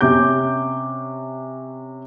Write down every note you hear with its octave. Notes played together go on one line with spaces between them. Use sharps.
C3 C#4 D6 G6